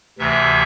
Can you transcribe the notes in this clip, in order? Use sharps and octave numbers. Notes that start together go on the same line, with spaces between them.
D2 C3 E3 E5